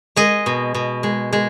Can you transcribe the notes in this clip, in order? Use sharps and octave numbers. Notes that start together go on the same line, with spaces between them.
G#3 D#5
B2
B2
G#3
G#3